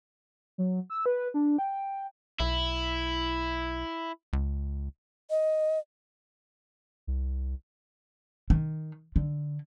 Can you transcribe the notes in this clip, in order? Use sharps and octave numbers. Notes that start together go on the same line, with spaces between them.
F#3
E6
B4
D4
G5
B1 E4
C#2
D#5
C2
D#3
D3